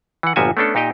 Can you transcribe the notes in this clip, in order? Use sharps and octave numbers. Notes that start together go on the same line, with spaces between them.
E3 F#5
G1 A#2 F3 F#4 E5 G#5
A3 B3 C#4 D4 A4
A#2 D#4 G4 D#5 G5